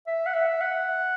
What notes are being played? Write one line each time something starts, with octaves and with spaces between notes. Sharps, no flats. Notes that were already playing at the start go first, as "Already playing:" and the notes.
E5
F#5
E5
F#5